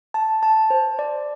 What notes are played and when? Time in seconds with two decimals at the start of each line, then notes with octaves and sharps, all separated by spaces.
0.14 A5
0.43 A5
0.70 C5
0.99 D5